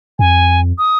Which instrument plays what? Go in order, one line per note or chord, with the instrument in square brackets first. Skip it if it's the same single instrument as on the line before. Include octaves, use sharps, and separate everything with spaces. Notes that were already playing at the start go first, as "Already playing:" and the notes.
[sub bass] F2 [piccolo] G#5
[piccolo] D#6